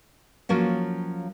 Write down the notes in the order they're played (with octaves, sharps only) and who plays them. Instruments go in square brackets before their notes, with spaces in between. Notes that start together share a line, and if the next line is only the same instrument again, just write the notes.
[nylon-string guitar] F3 F#3 A#3 C#4